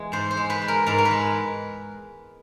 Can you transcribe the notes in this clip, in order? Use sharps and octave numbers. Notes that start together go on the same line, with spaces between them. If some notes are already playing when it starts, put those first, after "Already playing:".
Already playing: E2 E3 G#3
G#2 C5
C5
G#3
B4
G#3
A#4
G#2 A#4
A#4
B4
G#3